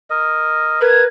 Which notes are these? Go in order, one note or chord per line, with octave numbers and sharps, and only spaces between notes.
A#4 D#5
A#4 B4 G#6